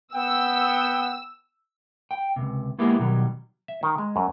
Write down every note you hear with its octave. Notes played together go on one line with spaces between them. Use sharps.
B3 F#5 G5 E6
G5
C#2 F#2 C3
G#3 A#3 B3 E4 G4 G#4
B2 D#3 F#3 G3
E5
D#3
G#3
F#2